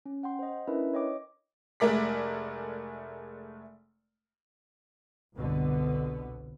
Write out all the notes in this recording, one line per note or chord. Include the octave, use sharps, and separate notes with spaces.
C#4
F#5 G5 C6
C5 D#5
C#4 D4 E4 A#4 B4 E5
C#5 D#5 G5 D6
F1 G#3 A3 A#4 D5 B6
G1 C2 B2 D3 B3